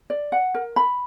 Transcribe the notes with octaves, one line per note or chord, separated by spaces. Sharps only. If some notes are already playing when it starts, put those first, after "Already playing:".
D5
F#5
A#4
B5